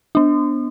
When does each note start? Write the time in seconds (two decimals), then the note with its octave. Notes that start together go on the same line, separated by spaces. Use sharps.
0.15 B3 D4